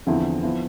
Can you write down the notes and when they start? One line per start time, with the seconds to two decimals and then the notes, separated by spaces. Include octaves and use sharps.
0.07 E2 D3 F3 C4 E4
0.42 F3 B3 E4